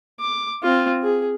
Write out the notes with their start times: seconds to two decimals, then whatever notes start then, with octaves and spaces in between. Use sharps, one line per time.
0.20 D6
0.63 C4 F4
1.03 G#4